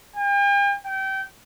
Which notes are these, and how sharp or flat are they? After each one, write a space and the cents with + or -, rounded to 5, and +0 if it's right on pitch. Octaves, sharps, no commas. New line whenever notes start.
G5 +45
G5 -25